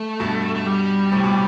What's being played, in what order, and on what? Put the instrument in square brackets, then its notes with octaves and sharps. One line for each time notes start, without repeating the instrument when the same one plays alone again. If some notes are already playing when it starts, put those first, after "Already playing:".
Already playing: [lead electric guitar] A3
[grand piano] G2 B2
[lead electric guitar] A3
G3
[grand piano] A2 C3
B2